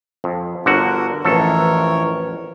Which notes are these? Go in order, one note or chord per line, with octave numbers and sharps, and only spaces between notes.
F2
G1 D3 F#4 A#4
A1 F2 E3 A4 A#4 C#5